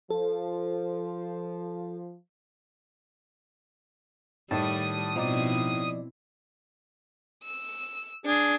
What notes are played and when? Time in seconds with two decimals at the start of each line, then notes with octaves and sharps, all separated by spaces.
0.10 F3 A4
4.51 A2 D#3 G3 A5 D#6
5.16 B2 F3 C4 D#4 E4 D5
7.44 E6
8.26 D4 G#4